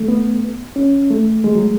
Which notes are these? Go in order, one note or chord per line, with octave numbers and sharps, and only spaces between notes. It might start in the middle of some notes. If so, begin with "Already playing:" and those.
Already playing: A3
B3
C#4
A3
G#3
F#3